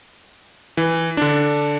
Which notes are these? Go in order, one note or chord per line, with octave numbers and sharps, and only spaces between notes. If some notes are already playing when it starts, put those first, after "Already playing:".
E3
D3 D4